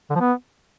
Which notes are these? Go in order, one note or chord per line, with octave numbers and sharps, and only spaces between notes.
D3
F3
B3